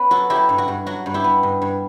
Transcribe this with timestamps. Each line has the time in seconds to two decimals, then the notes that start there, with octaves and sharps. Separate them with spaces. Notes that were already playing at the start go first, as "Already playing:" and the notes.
Already playing: B3 B4 C#5
0.11 F#3 F#4 A4
0.30 F#3 E4 G4
0.49 G2
0.58 F#4
0.68 G2
0.86 F#3 F#4
1.06 G2
1.14 E4 G4
1.24 B3
1.43 G2
1.62 G2